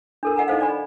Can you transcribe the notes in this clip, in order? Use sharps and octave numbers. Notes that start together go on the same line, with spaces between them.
D4 A4 A#4
D#5 F#5 G#5 A#5
D#4 A4 C5 F5
C5 D5 G#5 B5